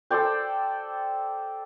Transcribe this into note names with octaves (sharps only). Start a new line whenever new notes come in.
A4 C5 D5 G5